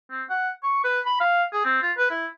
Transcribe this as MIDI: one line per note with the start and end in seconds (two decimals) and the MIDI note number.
0.11 0.23 60
0.30 0.51 78
0.63 0.84 85
0.84 1.00 71
1.06 1.20 83
1.20 1.44 77
1.53 1.61 68
1.65 1.79 60
1.82 1.92 65
1.98 2.07 71
2.10 2.27 64